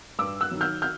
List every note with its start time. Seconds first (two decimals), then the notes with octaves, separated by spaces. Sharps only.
0.19 G2 D6 E6
0.41 E6 F#6
0.51 D#3 F#3
0.61 F6 G6
0.82 F6 G6